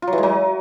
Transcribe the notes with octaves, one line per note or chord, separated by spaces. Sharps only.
F4
F#3
E3
G#3
F#3